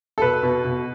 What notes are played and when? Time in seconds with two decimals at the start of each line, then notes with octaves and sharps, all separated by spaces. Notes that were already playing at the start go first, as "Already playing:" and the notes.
0.18 A4
0.21 B2 B4
0.43 B2
0.65 B2